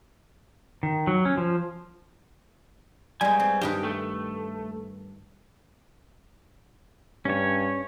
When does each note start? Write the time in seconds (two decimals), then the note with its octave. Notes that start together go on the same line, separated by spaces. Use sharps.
0.83 D#3
1.07 F#3
1.25 C#4
1.38 F3
3.21 G2 F3 G3 G#3 G#5
3.40 C4
3.61 G2 D#3 G4 B4
3.83 A3
7.25 G2 C#4 C#5